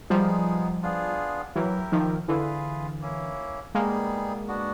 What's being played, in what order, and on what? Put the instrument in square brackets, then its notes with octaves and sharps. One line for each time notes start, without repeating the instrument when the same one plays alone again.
[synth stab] F3 G3 [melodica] G#3 B3 D#4 G#4
[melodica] B3 D4 F4 G#4
[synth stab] E3 F#3 [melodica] E4 G4 A#4
[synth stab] D#3 F3
[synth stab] D3 E3 [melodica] F4 G#4 B4
[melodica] A#3 C#4 E4
[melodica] G3 B3 D#4 G#4 [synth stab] G#3 A#3
[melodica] B3 D4 F#4